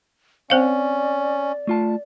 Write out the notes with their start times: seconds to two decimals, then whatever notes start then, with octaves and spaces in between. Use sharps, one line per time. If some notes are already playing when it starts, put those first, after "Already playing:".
0.50 C4 C#4 C5 D5 F5
1.67 A3 F4 A5